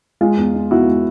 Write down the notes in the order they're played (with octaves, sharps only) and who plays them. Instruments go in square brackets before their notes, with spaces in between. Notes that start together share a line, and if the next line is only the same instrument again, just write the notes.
[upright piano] G#3 F4
E2
G#3
E2 E4 F#4
G#3